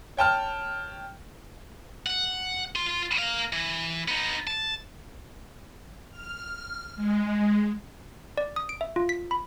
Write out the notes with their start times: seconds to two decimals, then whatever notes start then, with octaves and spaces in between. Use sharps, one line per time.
0.17 C#5 G5 A5 F6
2.06 F#5
2.76 F4 C6
3.19 A#3 F5
3.53 E3
4.08 B3 D#4
4.47 A5
6.11 F6
6.96 G#3
8.37 D5
8.56 D#6
8.69 D7
8.81 E5
8.96 F4
9.09 B6
9.31 B5